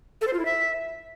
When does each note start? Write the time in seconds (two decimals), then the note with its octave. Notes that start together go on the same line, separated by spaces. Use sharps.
0.21 A4
0.27 C5
0.33 F4
0.39 E4
0.45 E5